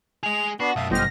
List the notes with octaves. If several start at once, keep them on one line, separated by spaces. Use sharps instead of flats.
G#3 G#4 F7
B3 D4 F#4 B5 C7
B1 F#2 E5 F5 A5 D#6
G1 G4 C5 D#5 F6 A#6